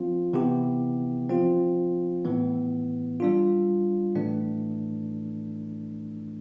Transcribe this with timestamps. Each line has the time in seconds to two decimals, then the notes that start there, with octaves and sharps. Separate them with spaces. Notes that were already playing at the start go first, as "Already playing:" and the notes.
Already playing: F3 C4 F4
0.33 C3 E3 B3 E4 G4
1.29 F3 C4 F4
2.25 A2 E3 B3
3.20 G3 D4 F4
4.15 A2 E3 A3 D4